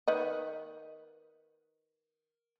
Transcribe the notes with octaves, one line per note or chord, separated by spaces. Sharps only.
D#3 B4 D#5